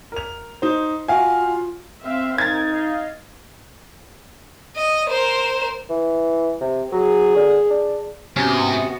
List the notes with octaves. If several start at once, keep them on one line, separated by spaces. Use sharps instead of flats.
A#4 F7
D#4 C5
F4 F#4 F5 G#5
C4 E5 F5
D#4 A#4 G#6 A6
D#5 F5
D#5
A#4 C5
E3
C3
F#3 G#4
D3
D4
G#2 C3 B3 C#4 F#4 C6